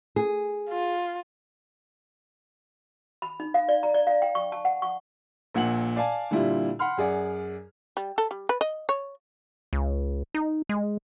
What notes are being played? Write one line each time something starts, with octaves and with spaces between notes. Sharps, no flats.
G#4
F4
B5
D#4
F5
D5
A#5
D5
F5
G5
C#6
A5
F#5
C#6
A#1 A#2 F#5 F#7
D5 F5 G#5 A5
A#2 D3 G3 E4 F4
F#5 B5 C6 F6
F#2 G#4 D5 F#5
G3
A4
G3
B4
D#5
C#5
C#2
D#4
G#3